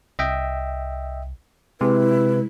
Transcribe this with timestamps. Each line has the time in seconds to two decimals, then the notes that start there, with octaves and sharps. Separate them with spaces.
0.19 C2 D#5 E5 G5
1.81 C3 G#3 E4 B4